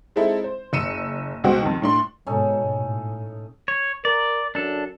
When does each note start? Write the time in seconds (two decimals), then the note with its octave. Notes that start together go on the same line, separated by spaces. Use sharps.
0.16 G#3 C4 D#4 E4 A4
0.44 C5
0.73 F#1 E6 C#7 D#7 E7
1.44 C#2 B2 F#4 C5 G5
1.62 F2 D#3
1.82 A2 D4 C6
2.27 G#2 B2 C#4 D#4 A4
2.71 A2
3.68 C#5
4.05 A#4 D5
4.55 F#2 D4 A4